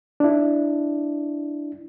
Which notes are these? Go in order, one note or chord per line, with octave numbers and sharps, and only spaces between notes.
D4 E4